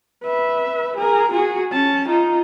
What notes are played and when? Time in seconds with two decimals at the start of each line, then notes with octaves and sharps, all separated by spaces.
0.23 B4 E5
0.97 G#4 A#4
1.32 F#4 G#4
1.72 C#4 A5
2.09 D#4 F4